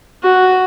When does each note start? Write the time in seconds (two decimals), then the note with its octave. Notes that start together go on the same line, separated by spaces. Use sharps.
0.23 F#4